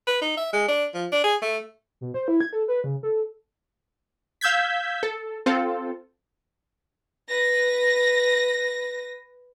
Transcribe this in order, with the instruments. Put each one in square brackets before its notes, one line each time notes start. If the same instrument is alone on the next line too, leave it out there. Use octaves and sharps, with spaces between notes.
[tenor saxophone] B4
D#4
E5
G#3
D4
F3
D4
G#4
A3
[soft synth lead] B2
C5
E4
G#6
A4
B4
C#3
A4
[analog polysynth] F5 E6 G6 G#6 B6
A4
C4 F4 A4
[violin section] B4 A#6